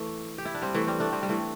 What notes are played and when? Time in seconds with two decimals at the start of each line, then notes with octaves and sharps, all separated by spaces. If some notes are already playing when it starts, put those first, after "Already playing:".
Already playing: E3 A3
0.38 G4
0.45 E4
0.54 D4
0.62 G3 C4
0.75 E3 A3
0.87 G3 C4
1.00 A3 D4
1.12 G3 C4
1.23 G3
1.29 E3 A3